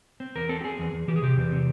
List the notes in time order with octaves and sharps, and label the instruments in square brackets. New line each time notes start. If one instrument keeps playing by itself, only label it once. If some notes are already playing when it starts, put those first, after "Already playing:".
[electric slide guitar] C4
E2 A#4
C4 A4
G4
C4 G#4
E2
E2
E3 G4
G#4
C3 G4
E2
C3